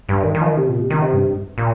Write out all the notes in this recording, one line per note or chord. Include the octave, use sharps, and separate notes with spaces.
G2
D#3
D#3
F3
D#3
C3
A#2
C3
D#3
C3
G2
A#2